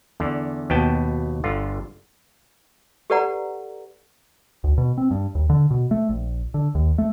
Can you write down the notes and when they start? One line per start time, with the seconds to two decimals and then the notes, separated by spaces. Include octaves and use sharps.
0.20 E2 D3
0.70 D#2 B2 B3 G5 A5
1.44 G1 D3 F4
3.10 G4 A4 B4 D5 F#5 A#5
4.64 D2
4.78 B2
4.98 C4
5.11 G2
5.35 D#2
5.50 D3
5.71 B2
5.91 A3
6.09 A#1
6.54 D3
6.75 D#2
6.98 A3